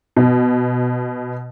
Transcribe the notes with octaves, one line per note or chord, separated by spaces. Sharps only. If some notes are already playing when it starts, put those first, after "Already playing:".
B2